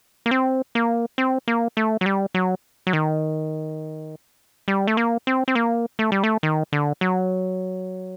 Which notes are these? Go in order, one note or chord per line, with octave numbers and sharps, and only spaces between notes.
A#3
C4
A#3
C4
A#3
A3
F#3
G3
F#3
F#3
D#3
G3
A3
A#3
C4
C4
A#3
A3
G3
A3
D#3
D3
F#3